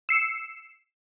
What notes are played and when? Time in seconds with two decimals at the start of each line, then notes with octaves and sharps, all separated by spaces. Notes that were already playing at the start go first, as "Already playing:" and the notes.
0.09 E6 C7 C#7 E7